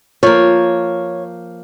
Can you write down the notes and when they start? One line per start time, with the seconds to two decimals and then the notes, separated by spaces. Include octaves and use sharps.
0.23 F3 A#3 C#5